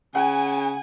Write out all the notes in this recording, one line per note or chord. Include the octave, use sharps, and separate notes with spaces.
C#3 F#5 G#5